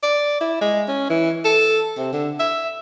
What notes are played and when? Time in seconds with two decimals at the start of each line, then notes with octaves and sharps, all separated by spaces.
0.03 D5
0.40 E4
0.61 G#3
0.88 C#4
1.09 E3
1.44 A4
1.97 C3
2.13 D3
2.39 E5